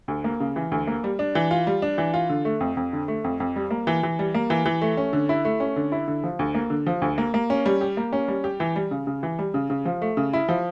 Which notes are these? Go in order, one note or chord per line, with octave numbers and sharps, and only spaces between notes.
D2
A#3
C#3
E3
D2
A#3
G3
D4
E3
F4
G3
D4
E3
F4
D3
A3
F2
F2
D3
A3
F2
F2
G3
A#3
E3
E3
G3
A#3
E3
E3
A3
C#4
D3
E4
A3
C#4
D3
E4
D3
F3
D2
A#3
D3
F3
D2
A#3
A#3
C#4
G3
G4
A#3
C#4
G3
G4
E3
G3
C#3
C#3
E3
G3
C#3
C#3
F3
A3
C#3
E4
F3